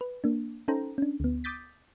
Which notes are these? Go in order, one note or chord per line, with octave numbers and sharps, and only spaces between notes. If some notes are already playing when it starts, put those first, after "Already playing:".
B4
A#3 D4
C#4 D#4 A4 C5 G5 A#5
C#4 D4
D2 B3
D6 D#6 G6 A6 B6